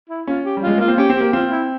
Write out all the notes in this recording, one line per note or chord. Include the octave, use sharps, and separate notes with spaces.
E4
C#4 F4
G4
G3
G#3 F4
A#3 F4
C4
C#4 G4
C4
A#3 G4
C4 F4
E4